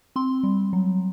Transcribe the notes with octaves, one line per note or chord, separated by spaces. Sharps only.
C4 C6
G3
F#3